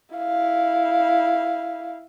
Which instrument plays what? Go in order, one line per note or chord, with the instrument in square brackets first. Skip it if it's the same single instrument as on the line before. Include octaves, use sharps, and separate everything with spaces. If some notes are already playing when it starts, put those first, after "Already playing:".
[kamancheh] E4 F5